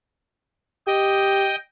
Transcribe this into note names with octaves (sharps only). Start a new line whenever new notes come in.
G4 D#5 G5